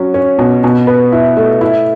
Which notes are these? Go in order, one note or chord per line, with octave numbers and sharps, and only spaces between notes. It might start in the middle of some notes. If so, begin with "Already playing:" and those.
Already playing: F#3 C#4
C#4
B2
B2
B4
E4
A3
E4